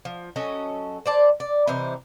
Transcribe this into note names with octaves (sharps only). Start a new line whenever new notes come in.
F3
F#3 C#4 A4 D#5
C5 D5 A5
D5
C3 E3 D#4 C5